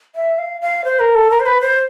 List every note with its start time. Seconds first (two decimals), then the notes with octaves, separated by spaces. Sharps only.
0.16 E5
0.39 F5
0.61 F5
0.85 C5
1.00 A#4
1.15 A4
1.31 A#4
1.40 C5
1.46 B4
1.61 C5